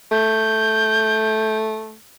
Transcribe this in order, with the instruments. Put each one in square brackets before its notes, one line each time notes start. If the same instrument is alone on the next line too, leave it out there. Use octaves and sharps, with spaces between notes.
[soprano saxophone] A3 [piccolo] G6